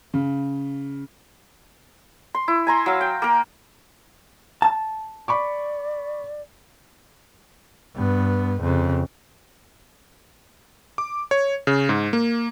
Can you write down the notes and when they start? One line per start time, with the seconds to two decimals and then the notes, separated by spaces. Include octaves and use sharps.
0.14 C#3
2.35 C6
2.48 E4
2.67 G#5 A#5 C6
2.86 F#3 F5
3.01 G5
3.22 A#3 A#4
4.62 A5
5.28 D5 B5 C#6 D6
7.95 G2 B3
8.61 F2 C#3
10.98 D6
11.31 C#5
11.67 C#3
11.89 G#2
12.13 A#3